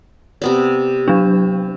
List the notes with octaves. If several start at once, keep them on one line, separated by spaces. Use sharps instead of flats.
C3 B3 D5
F#3 D4